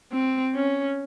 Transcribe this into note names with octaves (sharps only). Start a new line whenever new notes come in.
C4
C#4